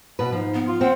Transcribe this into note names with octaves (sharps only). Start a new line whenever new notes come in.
B2 B4
G#2 F3
B3
F4
C4 F#5